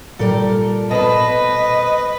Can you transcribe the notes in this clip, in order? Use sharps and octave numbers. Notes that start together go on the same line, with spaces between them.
A#2 G3 A4 A#4
B2 B4 C5 D#5 A5 D#6